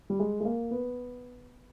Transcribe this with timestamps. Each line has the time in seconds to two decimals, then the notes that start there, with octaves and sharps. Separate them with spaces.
0.10 G3
0.19 G#3
0.40 G#3
0.45 A#3
0.71 B3